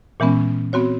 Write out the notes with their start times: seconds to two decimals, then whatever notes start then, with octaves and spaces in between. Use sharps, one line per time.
0.20 A#2 E3 G#3 B3 C#4
0.73 B3 C4 F#4 C#5